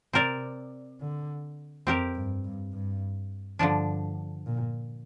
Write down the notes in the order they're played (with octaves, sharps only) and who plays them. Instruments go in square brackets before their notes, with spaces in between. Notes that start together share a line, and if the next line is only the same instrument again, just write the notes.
[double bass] C3 [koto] C4 A#4 D5
[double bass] D3
[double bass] F2 [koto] C4 G4 A#4
[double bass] G2
G2
G2
[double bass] G2 [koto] D3 F3 D4
[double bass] A#2